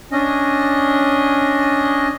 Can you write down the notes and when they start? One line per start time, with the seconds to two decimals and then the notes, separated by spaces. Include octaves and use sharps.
0.12 C#4 D4 D#5